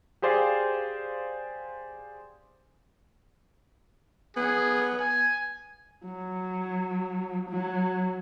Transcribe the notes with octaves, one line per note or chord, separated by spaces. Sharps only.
G4 G#4 C5 D5 F5
B3 G#4
G#5
F#3
F#3